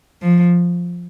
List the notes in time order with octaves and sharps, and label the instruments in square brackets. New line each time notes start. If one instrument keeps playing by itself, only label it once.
[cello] F3